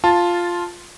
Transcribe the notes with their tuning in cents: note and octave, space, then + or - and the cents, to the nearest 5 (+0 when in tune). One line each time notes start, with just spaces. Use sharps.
F4 +0 A5 +0